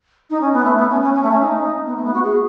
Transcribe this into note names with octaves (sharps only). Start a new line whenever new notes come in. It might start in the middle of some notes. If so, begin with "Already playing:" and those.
D#4
C#4
B3
A3
B3
C#4
C#4
C#4
A3
C#4
D#4
B3
A3
B3
F#4
G#4